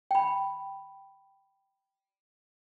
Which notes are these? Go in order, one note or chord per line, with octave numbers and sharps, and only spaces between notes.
G5 B5